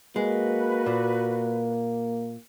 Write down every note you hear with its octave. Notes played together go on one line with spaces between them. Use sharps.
G#3 A#3 F#4 B4
A#2